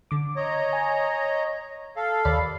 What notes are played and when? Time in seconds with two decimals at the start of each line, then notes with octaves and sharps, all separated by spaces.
0.11 D3 D6
0.36 C#5 D#5 A#5
0.73 G#5
1.96 A4 F5
2.25 D#2 D5 B5